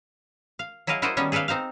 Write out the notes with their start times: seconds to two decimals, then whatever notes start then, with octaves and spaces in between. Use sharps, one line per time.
0.59 F5
0.87 F#3 E4 G#4 D#5 F5
1.02 E4 F#4 A#4 C5 D5 D#5
1.17 D#3 G3 A#3 B3 C#4 G#4
1.32 G#4 A4 B4 D5 F5
1.48 C4 D#4 C5 F5